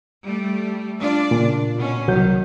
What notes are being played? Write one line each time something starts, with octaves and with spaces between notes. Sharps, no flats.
G3 A3
D4 F4 D5
A#2 C#3
B2 C#4
C2 D#3 F#3 G6